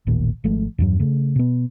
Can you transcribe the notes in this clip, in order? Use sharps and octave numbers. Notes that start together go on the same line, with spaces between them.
D#1 A1 D#2 A#2
G#1 F3 G#3 A3
E2 G2 F#3
C#3 A3
B2 B3